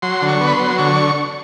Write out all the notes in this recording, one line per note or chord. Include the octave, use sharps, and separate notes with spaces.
F#3 C6
D3
C#6
B3
B5
C6
F#3
D3 C#6